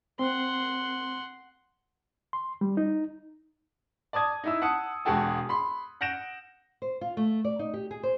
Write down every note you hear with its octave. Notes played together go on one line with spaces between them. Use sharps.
C4 F#5 C6
C6
G3
D#4
D5 A5 D#6 G#6
D#4 E4 E6
F#5 A5 D#6 C#7
E1 G#3 F#4 G#4 G5 A5
B5 C6
F#5 G6 A#6 D7 E7
C5
F4
A3
D5
D#4
G4
G#4
C5